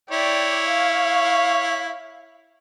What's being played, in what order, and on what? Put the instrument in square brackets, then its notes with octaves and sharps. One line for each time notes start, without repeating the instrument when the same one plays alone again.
[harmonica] E4 C#5 [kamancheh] D5 G5
[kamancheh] F5